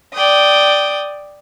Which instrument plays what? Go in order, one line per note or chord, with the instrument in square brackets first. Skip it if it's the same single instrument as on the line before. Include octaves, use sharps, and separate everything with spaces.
[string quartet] D5 G5 D#6